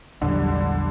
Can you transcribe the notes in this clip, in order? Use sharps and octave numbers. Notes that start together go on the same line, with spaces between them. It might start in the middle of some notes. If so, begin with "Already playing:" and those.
A#1 E2 D3 F#3 G3